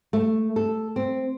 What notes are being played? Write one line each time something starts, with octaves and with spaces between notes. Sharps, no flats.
A3
A4
C4